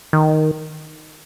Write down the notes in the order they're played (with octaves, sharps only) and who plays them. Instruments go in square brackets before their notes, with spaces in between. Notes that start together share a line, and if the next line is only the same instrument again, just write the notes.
[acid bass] D#3